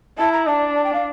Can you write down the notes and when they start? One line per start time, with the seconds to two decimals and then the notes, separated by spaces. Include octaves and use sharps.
0.18 E4 A5
0.32 A#5
0.46 D4 A5
0.75 A5
0.84 G5
0.93 F5